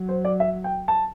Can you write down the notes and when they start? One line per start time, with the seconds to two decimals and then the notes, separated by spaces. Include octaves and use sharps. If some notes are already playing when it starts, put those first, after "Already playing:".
Already playing: F#3
0.09 C5
0.25 D5
0.40 E5
0.64 G5
0.88 A5